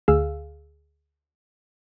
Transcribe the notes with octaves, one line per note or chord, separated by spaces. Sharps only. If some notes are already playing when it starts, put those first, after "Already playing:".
D2 G#4 F5 E6